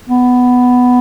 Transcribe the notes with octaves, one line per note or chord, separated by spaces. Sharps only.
B3